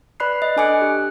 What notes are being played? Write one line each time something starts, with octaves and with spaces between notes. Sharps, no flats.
B4 D5 B5 F#6 C7
D#5
D4 A4 G#5 D6 F#6 C#7
G4